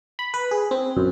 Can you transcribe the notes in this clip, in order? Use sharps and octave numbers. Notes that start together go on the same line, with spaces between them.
B5
B4
G#4
C4
F#2